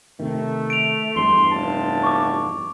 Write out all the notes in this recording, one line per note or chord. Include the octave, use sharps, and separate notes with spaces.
C3 D#3 A3
D7 F7
E2 G2 C6
F1 A5
C#6 D6